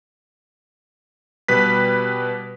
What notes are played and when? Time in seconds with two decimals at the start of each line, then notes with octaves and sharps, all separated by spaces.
1.48 B2 G3 B4 B6